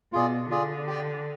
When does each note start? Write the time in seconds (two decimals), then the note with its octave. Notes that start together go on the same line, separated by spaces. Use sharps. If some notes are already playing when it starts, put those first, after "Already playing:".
0.12 B2 F4 G#4 D5
0.50 D3 F4 G#4 D5
0.87 G4 D5 G5